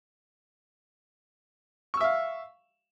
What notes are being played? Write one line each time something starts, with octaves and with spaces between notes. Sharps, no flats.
E5 F5 C#6 E6